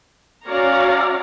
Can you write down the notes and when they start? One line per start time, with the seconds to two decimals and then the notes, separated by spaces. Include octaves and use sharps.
0.46 C#4 F#4 C#5 D5 F5 A#5